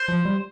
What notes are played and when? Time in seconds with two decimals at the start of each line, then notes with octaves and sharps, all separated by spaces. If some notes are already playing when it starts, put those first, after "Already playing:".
Already playing: C5
0.08 F3
0.25 G3